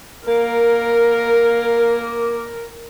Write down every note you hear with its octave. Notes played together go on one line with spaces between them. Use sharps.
A#3 A#4